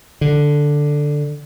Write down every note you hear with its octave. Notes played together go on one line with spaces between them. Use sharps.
D3